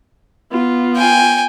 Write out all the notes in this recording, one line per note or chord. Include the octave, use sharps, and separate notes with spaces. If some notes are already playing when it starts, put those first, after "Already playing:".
B3 F4
G5 G#5